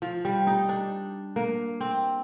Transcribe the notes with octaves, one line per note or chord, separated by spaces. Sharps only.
F3
G3
D#4
D4
A#3
C4